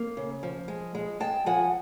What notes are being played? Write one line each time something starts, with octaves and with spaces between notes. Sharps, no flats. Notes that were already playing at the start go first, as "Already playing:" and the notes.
Already playing: A#3
C#3
F3
G#3
G#3
G#3 G5 A5
F3 F#5 G#5